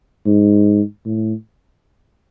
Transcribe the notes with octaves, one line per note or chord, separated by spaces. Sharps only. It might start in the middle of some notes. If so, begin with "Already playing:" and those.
G#2
A2